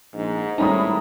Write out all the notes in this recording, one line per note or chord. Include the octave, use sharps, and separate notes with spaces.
A#1 G#2
G#1 A2 G3 C#4 D#4 A#5 B5 D#6